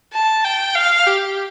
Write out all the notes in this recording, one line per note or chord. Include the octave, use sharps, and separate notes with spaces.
A5
G5
F5
G4